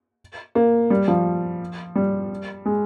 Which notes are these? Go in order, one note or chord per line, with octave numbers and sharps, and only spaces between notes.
A#3
G3
F3
G3
G#3